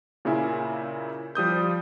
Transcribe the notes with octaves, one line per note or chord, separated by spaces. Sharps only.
A#2 C#3 C#4 E4
F3 G3 D#6 G6